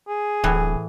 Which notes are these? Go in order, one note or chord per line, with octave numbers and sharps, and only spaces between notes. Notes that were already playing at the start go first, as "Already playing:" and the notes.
G#4
D1 A2 E3